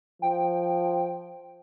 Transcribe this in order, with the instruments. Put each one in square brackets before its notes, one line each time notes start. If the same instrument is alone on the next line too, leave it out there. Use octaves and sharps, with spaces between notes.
[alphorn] F3 [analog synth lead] G5